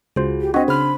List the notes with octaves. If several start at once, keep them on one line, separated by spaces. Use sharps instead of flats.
C#2 F4 F#4 G#4 C5
G4
C4 D4 F#4 D#5
C#3 C5 B5 C6 F6